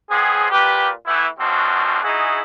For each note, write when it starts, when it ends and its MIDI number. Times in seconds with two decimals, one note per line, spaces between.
0.10 0.47 41
0.10 0.47 59
0.10 0.47 60
0.10 0.47 68
0.51 0.89 46
0.51 0.89 67
0.51 0.89 71
1.06 1.26 52
1.06 1.26 57
1.06 1.26 59
1.06 1.26 64
1.39 2.03 42
1.39 2.03 47
1.39 2.03 53
1.39 2.03 60
1.39 2.03 62
1.39 2.03 66
2.03 2.41 63
2.03 2.41 64
2.03 2.41 66
2.03 2.41 68